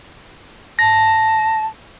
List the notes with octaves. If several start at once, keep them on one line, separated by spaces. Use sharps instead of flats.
A5 A#6